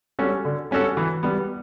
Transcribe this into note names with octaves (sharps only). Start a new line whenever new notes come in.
G3 C#4 F#4 A4
D3
G3 C#4 F#4 A4
E3
G3 B3